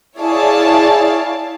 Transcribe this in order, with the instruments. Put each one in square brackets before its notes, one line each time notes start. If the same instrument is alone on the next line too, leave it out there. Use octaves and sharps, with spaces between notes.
[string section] E4 G#4 C#5 D5 F5 A5